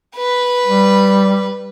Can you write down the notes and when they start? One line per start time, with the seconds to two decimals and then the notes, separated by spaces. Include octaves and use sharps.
0.16 B4
0.67 G3